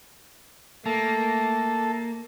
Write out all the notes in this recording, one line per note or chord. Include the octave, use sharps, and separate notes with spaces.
A3 A#3 A4